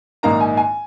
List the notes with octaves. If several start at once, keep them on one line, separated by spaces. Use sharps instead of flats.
A#1 G#2 D#3 A#3 D#4 A#5
G#5
G#5